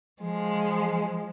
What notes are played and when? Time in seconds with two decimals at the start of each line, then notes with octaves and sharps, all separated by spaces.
0.21 F3 G#3